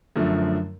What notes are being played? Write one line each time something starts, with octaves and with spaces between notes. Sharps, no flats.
F#2 D3 F3 A3